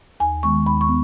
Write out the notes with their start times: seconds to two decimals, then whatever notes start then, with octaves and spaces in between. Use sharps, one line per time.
0.20 D#2 G#5
0.43 D#3 G#3 B3 C#6
0.66 D#2 B5
0.81 C#6
0.89 B3